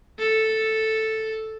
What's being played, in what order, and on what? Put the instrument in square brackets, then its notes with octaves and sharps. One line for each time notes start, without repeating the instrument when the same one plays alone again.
[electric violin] A4